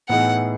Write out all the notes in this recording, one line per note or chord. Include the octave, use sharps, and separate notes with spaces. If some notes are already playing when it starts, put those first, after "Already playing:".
A2 E3 B3 D#4 G#4 F#5